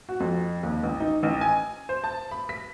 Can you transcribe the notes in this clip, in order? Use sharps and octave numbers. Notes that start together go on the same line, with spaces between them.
F#4
F2
D#2
A1
D#4
A1
G#5
C5
A5
B5
B6